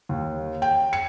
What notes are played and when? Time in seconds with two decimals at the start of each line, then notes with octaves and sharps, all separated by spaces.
0.09 D#2
0.62 G5
0.93 C#7